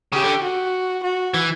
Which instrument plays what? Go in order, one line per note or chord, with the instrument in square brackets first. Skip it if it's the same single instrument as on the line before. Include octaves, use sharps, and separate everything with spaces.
[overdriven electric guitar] C#3 [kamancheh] G4
[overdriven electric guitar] D3
[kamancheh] F#4
F#4
[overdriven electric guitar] E3